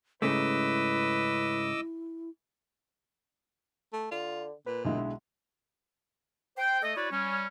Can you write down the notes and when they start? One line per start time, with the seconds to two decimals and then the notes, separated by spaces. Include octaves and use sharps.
0.22 G#2 C#3 A3 E4 B4 D#5 D6 E6
3.93 A3
4.11 D3 F4
4.66 A#2 B4
4.85 B1 D3 G#3 E4
6.58 C5 G5
6.82 A3 A4 D#5
6.97 E4 F#4 B4 C#5 D5
7.12 G3 C#4